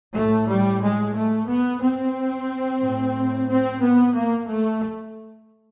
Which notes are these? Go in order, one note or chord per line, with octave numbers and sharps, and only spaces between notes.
A2 A3
G3
G#3
A3
B3
C4
A2
C4
B3
A#3
A3